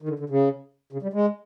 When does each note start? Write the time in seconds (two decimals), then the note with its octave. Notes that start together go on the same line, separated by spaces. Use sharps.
0.02 D#3
0.09 D3
0.19 D3
0.30 C#3
0.93 C#3
1.03 G3
1.13 G#3